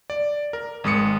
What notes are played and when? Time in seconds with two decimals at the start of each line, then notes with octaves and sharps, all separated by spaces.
0.10 D5
0.53 A#4
0.84 G#1 G#3 D#6 C#7